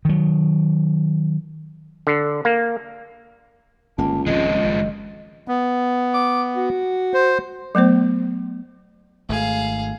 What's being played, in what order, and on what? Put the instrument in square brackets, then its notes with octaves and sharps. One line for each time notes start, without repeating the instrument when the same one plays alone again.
[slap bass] D#3 F#3
[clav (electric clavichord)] D3
A#3
[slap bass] G1 A#3 [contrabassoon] C#2 [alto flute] A5
[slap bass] D#1 D#3 C4 [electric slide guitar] F3 G#3 [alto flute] D#5
[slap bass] F#1 G2 D#3
[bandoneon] B3
[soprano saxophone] D6
F#4
[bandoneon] C5
[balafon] F#3 A3 B3 C5
[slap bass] G#1 G#2 [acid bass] A3 [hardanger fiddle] G#4 F5